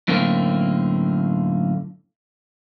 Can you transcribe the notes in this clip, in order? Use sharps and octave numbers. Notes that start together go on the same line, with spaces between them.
F#2 A2 D3 A#3 C4